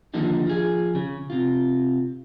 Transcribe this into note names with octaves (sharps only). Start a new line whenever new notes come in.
D3 D#3 F3 A#3 D4 D#4
F3 G#4
C#3
C3 F4